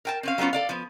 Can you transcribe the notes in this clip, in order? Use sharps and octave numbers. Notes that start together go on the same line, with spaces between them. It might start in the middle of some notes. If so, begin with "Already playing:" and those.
A#4 G5 A5
C4 C#4 F5
F#3 G3 B3 C#4 F4
A4 D5 F5
F3 B3